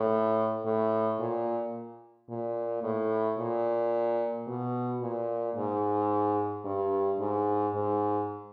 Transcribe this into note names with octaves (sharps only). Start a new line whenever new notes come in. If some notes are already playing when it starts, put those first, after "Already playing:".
Already playing: A2
A2
A#2
A#2
A2
A#2
B2
A#2
G#2
G2
G#2
G#2